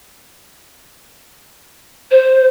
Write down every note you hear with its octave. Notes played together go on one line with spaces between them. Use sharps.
C5